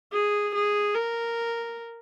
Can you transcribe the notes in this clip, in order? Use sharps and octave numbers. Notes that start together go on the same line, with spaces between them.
G#4
G#4
A#4